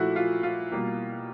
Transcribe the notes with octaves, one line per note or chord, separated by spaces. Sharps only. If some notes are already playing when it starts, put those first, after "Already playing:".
Already playing: A#2 F3 A3 E4 F#4
F4
F4
B2 G3 A#3